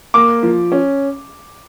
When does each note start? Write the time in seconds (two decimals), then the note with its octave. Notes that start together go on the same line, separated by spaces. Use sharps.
0.14 A#3 D6
0.43 F3
0.72 C#4